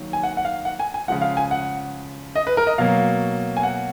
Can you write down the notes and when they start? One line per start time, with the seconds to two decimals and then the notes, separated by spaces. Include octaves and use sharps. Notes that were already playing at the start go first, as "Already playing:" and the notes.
Already playing: D#3 F#3 A#3
0.13 G#5
0.23 F#5
0.37 F#5
0.45 F5
0.65 F#5
0.79 G#5
0.94 G#5
1.08 C#3 F3 G#3 F#5
1.21 F5
1.37 G#5
1.51 F#5
2.35 D#5
2.47 B4
2.57 A#4
2.67 D#5
2.78 B2 F#3 A#3 F5
3.57 G#5
3.63 F#5